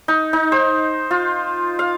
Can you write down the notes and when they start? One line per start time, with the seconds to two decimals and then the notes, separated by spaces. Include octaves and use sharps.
0.08 D#4
0.33 D#4
0.52 C5
1.11 F4
1.79 F5